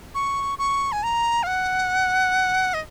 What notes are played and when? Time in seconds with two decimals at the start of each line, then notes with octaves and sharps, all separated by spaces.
0.15 C#6
0.58 C#6
0.92 G#5
1.03 A#5
1.43 F5
1.47 F#5
2.74 D#5